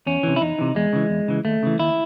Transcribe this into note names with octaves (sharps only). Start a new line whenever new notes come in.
E2 C#4
C3 E3
E4
E2 D#4
C3 E3
E2 G#3
C#3 E3
E2
C#3 E3
D#2 A3
C#3 E3
D#2 E4